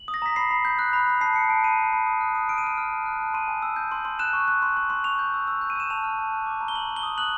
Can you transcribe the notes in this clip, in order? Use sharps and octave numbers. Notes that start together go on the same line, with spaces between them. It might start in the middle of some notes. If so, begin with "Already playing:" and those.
Already playing: F#7
D#6
A#6
A#5 B6
B5 C7
B5
G6
F#6
B5
B5
A5 C7
A5 C#7
A5 D7
B5 D#7
B5
B5
D#6
F#6
D#6
F6 D7
D#7
F6 D7
F6
A5
F#6
A5
C6 D#7
G#5
E6
G6
C6
C6
F#6 E7
C#6
F#6
C6
C6
C6
C#6 F7
G6
E6
E6
G6
D#7
E6 E7
A5 F7
F6
A5
F#6
D6
A#5
G7
A#5 F#7
A#5
G7
D#6
F#6 F#7